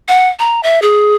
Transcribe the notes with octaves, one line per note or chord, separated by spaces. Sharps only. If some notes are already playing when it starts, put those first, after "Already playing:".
F#5
A#5
E5
G#4